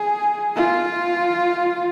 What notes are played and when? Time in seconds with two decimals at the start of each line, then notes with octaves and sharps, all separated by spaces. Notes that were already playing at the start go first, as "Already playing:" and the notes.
Already playing: G#4
0.56 F4